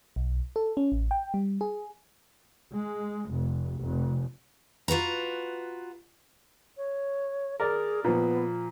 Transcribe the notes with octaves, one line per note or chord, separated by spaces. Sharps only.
B1
A4
C#4
A1
G5
G3
G#4
G#3
F1
F1
F4 F#4 B4 A#5
C#5
G#4 A#4 D5
A#2 F3 B3